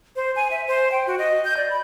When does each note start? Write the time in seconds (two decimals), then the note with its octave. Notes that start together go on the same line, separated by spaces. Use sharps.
0.16 C5
0.36 G#5
0.51 E5
0.68 C5
0.92 G5
1.07 F#4
1.19 D#5
1.45 G6
1.57 D5
1.70 B5